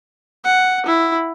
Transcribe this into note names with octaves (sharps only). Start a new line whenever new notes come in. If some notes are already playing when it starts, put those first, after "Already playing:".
F#5
E4